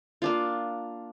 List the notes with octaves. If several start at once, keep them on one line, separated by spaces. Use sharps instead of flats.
A#3 D4 F4